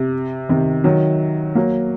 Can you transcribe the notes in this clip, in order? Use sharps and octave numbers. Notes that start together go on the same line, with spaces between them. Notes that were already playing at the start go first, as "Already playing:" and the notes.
Already playing: C3
C3 D#3
D#3 F#3
F#3 A#3